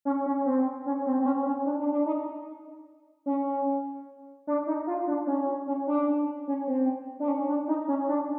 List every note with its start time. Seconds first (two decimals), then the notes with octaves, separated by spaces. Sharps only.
0.05 C#4
0.26 C#4
0.46 C4
0.86 C#4
1.06 C4
1.20 C4
1.26 C#4
1.46 C#4
1.66 D4
1.80 D4
1.92 D4
2.06 D#4
3.26 C#4
4.47 D4
4.67 D#4
4.87 F4
5.07 D4
5.27 C#4
5.67 C#4
5.87 D4
6.48 C#4
6.67 C4
7.20 D4
7.28 C#4
7.48 D4
7.68 D#4
7.88 C#4
8.08 D4